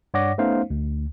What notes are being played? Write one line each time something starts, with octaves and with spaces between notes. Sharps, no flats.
G2 C#5 D5 F#5 D6 A#6
A3 B3 C#4 D#4 C5 F5
D2